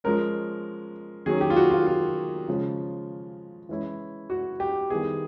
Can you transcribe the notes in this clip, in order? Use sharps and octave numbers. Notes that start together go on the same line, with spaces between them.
F3 G#3 C#4 A#4
D#3 F#3 A#3 C#4 G#4
G4
F4
F#4
F4
F4
C#3 F3 G#3 C#4
E3 G#3 C#4 E4
F#4
G4
D#3 G3 B3 E4 G#4